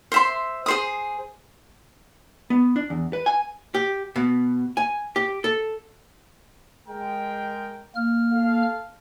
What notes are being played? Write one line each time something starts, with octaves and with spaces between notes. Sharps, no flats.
C5 E5 C6
G#4 C5 D#6
B3
D4
E2
B4
G#5
G4
B2
G#5
G4
A4
G#3 A#4 G5
A#3 F6
A4 F5